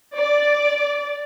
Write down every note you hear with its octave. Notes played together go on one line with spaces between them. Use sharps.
D5